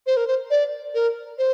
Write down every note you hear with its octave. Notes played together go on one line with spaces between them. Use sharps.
C5
A#4
C5
D5
A#4
C5